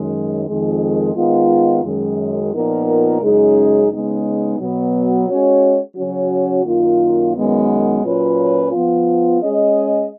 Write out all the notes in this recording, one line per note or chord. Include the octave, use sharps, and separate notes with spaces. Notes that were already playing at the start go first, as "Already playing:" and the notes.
Already playing: F#2 D#3 G#3
F2 D#3 G#3
D#3 G#3 B3 F4
F#2 D#3 G#3
A#2 F3 B3 D#4 A#4
F#2 C#3 G#3 D#4 G#4
C#3 G#3 B3 D#4
B2 F#3 B3
G#3 C#4 F#4 C#5
C#3 F#3 C#4 F#4
F#2 D#3 A#3 F4
F#2 D#3 G#3 B3
A#2 F#3 C#4 F4 B4
F3 B3 F4
G#3 C#4 G#4 D#5